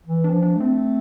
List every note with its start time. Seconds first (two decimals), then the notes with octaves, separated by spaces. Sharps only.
0.05 E3
0.24 D4
0.30 F3
0.42 D4
0.55 A3
0.60 C4